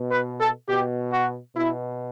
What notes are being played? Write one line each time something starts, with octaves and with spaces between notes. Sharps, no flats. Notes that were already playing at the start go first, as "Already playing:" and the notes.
Already playing: B2
B4
A4
B2 G4
F#4
B2 E4